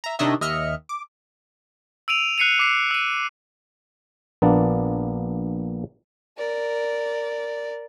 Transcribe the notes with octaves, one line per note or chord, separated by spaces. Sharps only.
E5 A#5
C3 D#3 D4 C#5 D#5 E5
D#2 D#5 E5 F6 C#7
D6
E6 D7 D#7 F7
F#6 C7 C#7 D#7 F7
D6 C7
E6 D#7
A#1 A#3 B3 D4 A5
A#4 D5